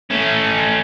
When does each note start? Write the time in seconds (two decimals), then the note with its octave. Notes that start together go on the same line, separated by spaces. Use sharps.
0.10 A3 C#4